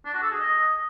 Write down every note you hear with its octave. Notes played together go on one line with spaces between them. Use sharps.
D4
F#4
A4
G#4
D#5